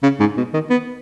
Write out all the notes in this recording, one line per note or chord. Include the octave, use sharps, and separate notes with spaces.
C#3
G#2
B2
D#3
B3